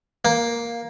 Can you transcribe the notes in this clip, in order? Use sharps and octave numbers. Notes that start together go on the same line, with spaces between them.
A#3